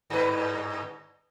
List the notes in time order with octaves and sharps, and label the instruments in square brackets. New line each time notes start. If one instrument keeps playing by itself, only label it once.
[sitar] G2 B4